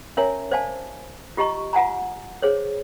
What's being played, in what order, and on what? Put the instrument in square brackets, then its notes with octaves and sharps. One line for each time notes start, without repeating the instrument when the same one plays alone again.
[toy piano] C#4 A#4 C#5 E5 G#5 A#5
C5 D5 F5 G#5 A5
F4 G4 D#5 A#5 C#6
F4 F#5 G#5 A#5
G#4 C5 C#5